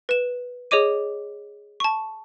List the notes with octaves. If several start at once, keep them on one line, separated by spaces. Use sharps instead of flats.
B4 E7
G#4 C#5 D#5 D6 D#7
A5 C#6